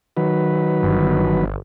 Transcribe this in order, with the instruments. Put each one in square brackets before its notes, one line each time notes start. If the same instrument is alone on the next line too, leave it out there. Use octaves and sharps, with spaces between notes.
[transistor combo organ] D#3 F#3 B4
[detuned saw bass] G1